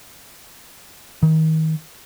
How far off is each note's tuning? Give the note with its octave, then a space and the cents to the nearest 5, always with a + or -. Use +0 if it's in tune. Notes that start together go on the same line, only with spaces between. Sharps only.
D#3 +30